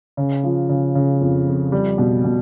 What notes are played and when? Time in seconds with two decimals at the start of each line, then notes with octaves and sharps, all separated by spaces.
0.17 C#3
0.43 F3
0.69 C#3
0.95 C#3
1.21 F2
1.47 F2
1.72 G3
1.98 B2
2.24 B2